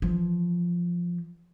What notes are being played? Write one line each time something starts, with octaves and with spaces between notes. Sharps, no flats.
E3 F3